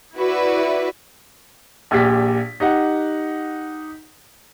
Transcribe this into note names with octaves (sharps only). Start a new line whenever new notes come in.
E4 F#4 B4 D5 E5
A#1 A#2 G4 B6
D#4 G4 F#5